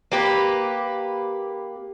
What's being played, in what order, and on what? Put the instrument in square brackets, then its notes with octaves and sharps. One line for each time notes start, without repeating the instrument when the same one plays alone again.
[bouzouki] A#3 G4 B4